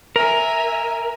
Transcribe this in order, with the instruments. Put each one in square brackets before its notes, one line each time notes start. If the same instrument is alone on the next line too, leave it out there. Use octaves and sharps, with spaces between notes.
[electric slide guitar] A#4 [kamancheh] E5 G#5 [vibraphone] A#5